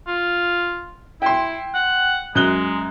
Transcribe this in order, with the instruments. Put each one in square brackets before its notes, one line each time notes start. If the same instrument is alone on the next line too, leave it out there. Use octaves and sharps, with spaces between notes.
[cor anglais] F4
[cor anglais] E4 [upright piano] G5 C6
[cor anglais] F#5
[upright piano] F#2 F#6 G7 [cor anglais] G#3